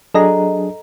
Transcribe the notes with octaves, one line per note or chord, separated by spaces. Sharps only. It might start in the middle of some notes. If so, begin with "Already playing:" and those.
F#3 D4 G#4 A4 D#5 A#5